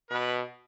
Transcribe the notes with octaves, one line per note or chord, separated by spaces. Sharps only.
B2 B4